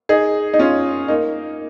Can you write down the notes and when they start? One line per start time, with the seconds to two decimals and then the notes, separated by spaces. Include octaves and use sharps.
0.09 D#4 G#4
0.54 D#4
0.59 C#4 F4
1.08 A#3 D#4